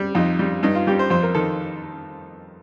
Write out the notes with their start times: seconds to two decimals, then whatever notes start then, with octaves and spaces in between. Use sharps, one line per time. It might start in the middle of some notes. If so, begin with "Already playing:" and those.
Already playing: G3
0.15 F2 D#4
0.39 G3
0.63 G2 D#4
0.75 F4
0.87 G3 G4
0.99 C5
1.10 F2 C5
1.23 A#4
1.35 D#3 A4